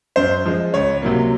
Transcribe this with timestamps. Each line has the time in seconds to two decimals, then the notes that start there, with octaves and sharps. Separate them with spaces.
0.16 F#2 C5
0.46 F3 G#3
0.74 C#2 C#5
1.02 C3 F#3 A#3